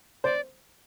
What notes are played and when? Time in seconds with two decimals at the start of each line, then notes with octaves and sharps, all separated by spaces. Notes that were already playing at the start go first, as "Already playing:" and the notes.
0.24 C5 D5